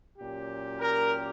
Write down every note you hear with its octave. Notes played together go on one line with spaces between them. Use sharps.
A#2 F#3 C#4 G4
A#4